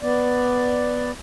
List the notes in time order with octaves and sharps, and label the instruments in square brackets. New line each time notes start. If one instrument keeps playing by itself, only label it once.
[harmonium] B3 D5